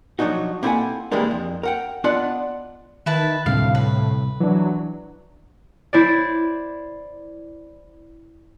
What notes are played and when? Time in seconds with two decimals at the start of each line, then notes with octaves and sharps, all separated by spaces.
0.19 F3 F#3 D4 D#4 F#4
0.63 A#3 C4 E4 A4 F#5 G#5
1.12 C3 E3 G3 G#3 A#3 D4
1.31 F2
1.63 A#4 F#5 G5
2.04 B3 D4 F4 D5 D#5 F#5
3.06 D#3 E4 B4 A5
3.46 D2 A2 C3 G3 C4 F5
3.75 B4
4.40 E3 F#3 D4
5.93 E4 C5 D5